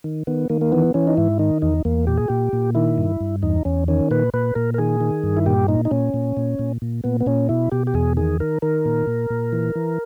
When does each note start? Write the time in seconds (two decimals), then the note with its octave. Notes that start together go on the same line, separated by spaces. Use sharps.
0.04 D#3
0.27 D#3 B3
0.50 D#3 A#3
0.61 A#3
0.72 E3 B3
0.94 E3 C#4
1.07 D#4
1.17 G#2 E4
1.39 D#3 D#4
1.62 E2 D#4
1.85 E2 A#3
2.07 A#2 G4
2.17 G#4
2.28 A#2 G4
2.53 A#2
2.75 D#3 E4
2.98 G2
3.21 G2
3.42 E2 D#4
3.65 E2 C#4
3.88 D#3 C#4
4.11 A#2 B4
4.34 A#2 B4
4.55 A#2 A#4
4.74 A#4
4.78 D#3 G#4
5.01 D#3
5.23 G2
5.37 E4
5.46 A#2 G4
5.68 A#2 D#4
5.85 D#4
5.91 A#2 C#4
6.14 A#2
6.37 A#2
6.59 A#2
6.82 A#2
7.04 A#2 B3
7.21 B3
7.26 A#2 C#4
7.49 B2 E4
7.72 B2 G4
7.87 G4
7.94 E2 G#4
8.17 D#3 G#4
8.40 D#3 A#4
8.62 D#3 A#4
8.85 A#2
9.07 A#2
9.30 A#2
9.52 E3
9.75 E3